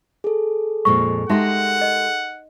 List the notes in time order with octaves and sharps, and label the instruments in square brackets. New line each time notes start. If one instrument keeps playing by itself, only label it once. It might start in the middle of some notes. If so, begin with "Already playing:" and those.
[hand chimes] G#4 A4
[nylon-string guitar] F2 A#2 G#3 [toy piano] C#6
[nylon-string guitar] G#3 G4 A#4 [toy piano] D#4 E5 C6 [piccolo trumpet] F#5
[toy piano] D#5